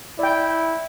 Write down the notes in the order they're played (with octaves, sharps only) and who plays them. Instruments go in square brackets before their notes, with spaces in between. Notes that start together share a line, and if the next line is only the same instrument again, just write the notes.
[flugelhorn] E4 [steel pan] D5 G5